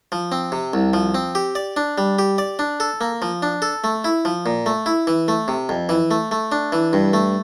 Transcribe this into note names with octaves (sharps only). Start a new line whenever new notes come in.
F3
C4
C3
C2
F3
C4
G4
D5
D4
G3
G4
D5
D4
A4
A#3
F3
D4
A4
A3
E4
F3
A#2
A3
E4
E3
A3
C3
F2
E3
A3
A3
D4
E3
G2
A3